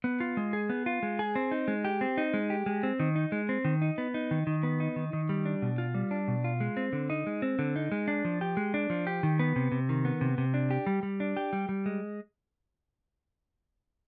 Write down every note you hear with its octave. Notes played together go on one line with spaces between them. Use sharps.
B3
F4
G#3
G#4
B3
F4
G#3
G#4
C4
D#4
G#3
G4
C4
D#4
G#3
G4
G#3
C4
D#3
D#4
G#3
C4
D#3
D#4
B3
D#4
D#3
D#3
B3
D#4
D#3
D#3
G3
D4
B2
F4
G3
D4
B2
F4
G#3
C4
D3
D#4
G#3
C4
D3
D#4
G#3
D4
F3
G4
G#3
D4
F3
G4
D#3
B3
C3
C3
D#3
B3
C3
C3
D4
G4
G3
G3
D4
G4
G3
G3
G#3